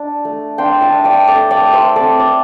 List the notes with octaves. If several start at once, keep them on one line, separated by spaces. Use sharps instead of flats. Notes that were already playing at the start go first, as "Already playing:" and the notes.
Already playing: D4
A3
D4 G5 C6
E5 A5
D4
D5 G5
A3 A4 D5
D5 G5
A3
C5 E5
C4 A4 D5
D5